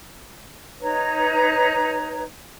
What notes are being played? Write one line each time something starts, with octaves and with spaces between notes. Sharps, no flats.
D#4 B4 C#5 A#5